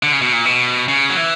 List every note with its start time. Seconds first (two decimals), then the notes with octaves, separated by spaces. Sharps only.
0.03 D3
0.13 C#3
0.22 B2
0.32 A#2
0.45 B2
0.88 C#3
1.09 F#3
1.17 E3